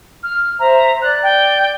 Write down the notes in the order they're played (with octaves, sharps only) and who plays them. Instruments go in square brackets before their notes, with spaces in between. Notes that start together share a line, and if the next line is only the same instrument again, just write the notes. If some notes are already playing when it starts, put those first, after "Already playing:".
[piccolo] F6
[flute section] C5 E5 [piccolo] A#5
[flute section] D5 [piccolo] F#6
[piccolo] G5